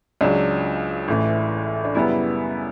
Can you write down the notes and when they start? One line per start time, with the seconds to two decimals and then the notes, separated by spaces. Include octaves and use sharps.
0.21 C#2 C#3 F#3 D4
1.08 A1 A2 E3
1.85 D4
1.95 F#2 C#3 G3 B3 E4